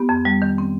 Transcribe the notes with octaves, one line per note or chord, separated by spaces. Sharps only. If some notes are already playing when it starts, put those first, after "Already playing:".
Already playing: B3 G4
F2
G3
D#3
C4